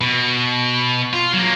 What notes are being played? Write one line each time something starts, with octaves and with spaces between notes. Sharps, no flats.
B2
F4
F#3 A#3